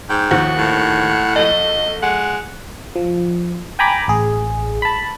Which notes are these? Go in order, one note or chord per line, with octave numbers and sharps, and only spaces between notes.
G#2 G5
D#2 D#3 F3 F#5
A2
A#1 A4 D#5
G#3 F#5
F3
G5 G#5 A#5 B5 D6
A1 G#4
A5 B5